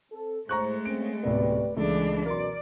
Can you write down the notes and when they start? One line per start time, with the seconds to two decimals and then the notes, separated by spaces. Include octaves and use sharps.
0.12 C4 A4
0.49 A2 G#3 A3 C5 A#5 C#6 F#6
0.85 A#3 C4 C#4 D7
1.23 D1 C3 B3 G4 B4 D5
1.76 C#2 E3 G#3 A3 D4
2.26 F#2 B2 A#4 D5 C6